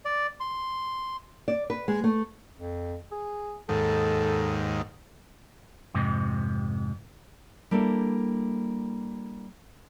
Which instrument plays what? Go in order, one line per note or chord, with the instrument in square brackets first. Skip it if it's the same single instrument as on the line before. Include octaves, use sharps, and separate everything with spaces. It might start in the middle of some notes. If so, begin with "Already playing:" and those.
[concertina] D5
C6
[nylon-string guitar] D5
B4
G#3
A3
[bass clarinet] F2
G#4
[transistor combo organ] D#2 G#2 [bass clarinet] A4
[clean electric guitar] F2 G#2 C3
[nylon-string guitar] G3 A#3 D4 E4 A4